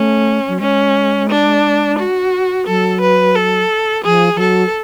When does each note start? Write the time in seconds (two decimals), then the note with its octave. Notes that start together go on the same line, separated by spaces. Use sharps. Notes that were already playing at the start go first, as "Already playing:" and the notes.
Already playing: A3 C#4
0.48 F#3
0.60 G#3 C#4
1.29 D4
1.99 F#4
2.67 F#3 A4
3.01 B4
3.36 A4
4.04 F3 G#4
4.36 F3
4.40 F#3 A4